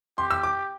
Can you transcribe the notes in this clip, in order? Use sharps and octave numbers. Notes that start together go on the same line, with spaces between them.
G4 C6
E6
D6